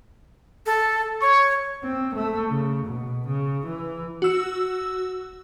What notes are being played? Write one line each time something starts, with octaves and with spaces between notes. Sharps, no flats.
A4
C#5 C#6
C4
A3
C#3
B2
C#3
E3
F#4 E6